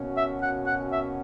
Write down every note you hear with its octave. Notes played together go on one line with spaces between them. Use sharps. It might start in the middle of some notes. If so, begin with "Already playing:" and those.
Already playing: B2 A#3 C#4 F#4
E5
F#5
F#5
E5